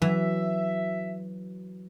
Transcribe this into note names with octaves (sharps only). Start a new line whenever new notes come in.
E3 F#3 E5